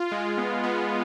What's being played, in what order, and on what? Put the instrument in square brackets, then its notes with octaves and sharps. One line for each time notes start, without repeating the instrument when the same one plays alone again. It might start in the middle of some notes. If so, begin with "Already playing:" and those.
Already playing: [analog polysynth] F4
G#3
B3
B3